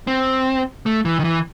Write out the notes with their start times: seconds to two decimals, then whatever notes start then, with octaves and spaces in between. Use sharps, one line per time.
0.07 C4
0.86 A3
1.05 E3
1.19 D#3
1.24 E3